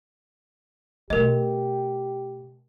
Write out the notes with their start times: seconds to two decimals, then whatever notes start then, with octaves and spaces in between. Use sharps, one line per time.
1.10 B2 A3 G4 A#4 D#5